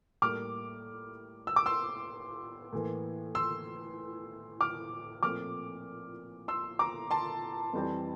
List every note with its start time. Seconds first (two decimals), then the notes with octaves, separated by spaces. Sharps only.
0.22 A2 G3 A#3 D6 F6
1.47 E6
1.56 D6
1.66 C6 E6
2.72 A2 E3 A#3
3.35 C6 E6
4.61 D6 F6
5.23 A#2 F3 A3 C4 D6 F6
6.48 C6 E6
6.79 A#5 D6
7.11 A5 C6
7.73 F2 E3 G3 C4